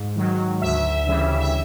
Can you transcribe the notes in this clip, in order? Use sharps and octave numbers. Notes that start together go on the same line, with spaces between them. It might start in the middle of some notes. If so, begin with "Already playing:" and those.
Already playing: G#2
D#3 F#3
D2 E5
C#3 E3 G3
E5